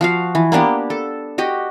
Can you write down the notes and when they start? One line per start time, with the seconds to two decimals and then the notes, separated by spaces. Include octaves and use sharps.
0.01 F3 F#4 F5
0.35 E3
0.52 A#3 B3 D4 G4
0.90 A4
1.38 F#4 G4 D#5